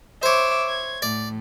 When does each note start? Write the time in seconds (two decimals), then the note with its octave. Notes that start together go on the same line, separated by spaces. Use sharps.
0.23 C5 C#5 E5 D6
0.68 G#6
1.02 A2 D5